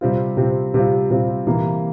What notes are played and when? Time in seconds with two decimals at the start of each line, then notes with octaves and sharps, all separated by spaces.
0.01 C3 G3 C4 F4
0.37 C3 G3 C4 F4
0.74 C3 G3 C4 F4
1.10 C3 G3 C4 F4
1.47 C3 E3 A#3